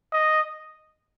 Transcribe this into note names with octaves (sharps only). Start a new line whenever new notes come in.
D#5